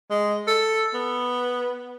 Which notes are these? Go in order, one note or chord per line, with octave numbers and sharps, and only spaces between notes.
G#3
A4
B3